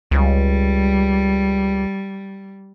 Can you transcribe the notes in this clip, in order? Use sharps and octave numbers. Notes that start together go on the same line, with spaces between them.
C#2 G3